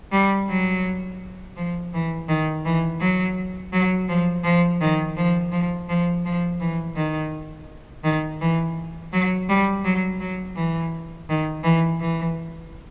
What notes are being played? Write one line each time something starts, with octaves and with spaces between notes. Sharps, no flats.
G3
F#3
F3
E3
D#3
E3
F#3
F#3
F3
F3
D#3
F3
F3
F3
F3
E3
D#3
D#3
E3
F#3
G3
F#3
F#3
E3
D#3
E3
E3